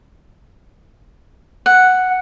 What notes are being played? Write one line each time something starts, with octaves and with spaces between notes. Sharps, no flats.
F#5